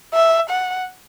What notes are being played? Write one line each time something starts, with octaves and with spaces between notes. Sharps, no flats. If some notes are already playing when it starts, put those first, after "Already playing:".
E5
F#5